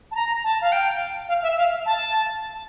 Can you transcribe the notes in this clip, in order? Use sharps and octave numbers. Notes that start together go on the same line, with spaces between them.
A5
A#5
A5
F5
G5
F5
E5
F5
A5